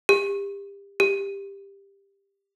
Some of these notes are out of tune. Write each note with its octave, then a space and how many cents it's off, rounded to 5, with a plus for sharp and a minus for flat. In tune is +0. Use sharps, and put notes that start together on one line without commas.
G4 +30
G4 +15